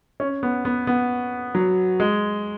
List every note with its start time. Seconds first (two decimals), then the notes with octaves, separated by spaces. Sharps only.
0.20 C#4
0.43 B3
0.65 B3
0.87 B3
1.55 F#3
2.00 G#3